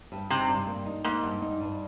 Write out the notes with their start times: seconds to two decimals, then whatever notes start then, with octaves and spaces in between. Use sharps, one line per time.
0.12 G2
0.30 C3 D#4
0.49 G2
0.67 A#3
0.86 D#4
1.04 G#2 A#3
1.23 G2
1.42 D#4
1.60 G2